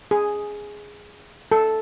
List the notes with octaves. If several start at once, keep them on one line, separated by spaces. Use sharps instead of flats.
G#4
A4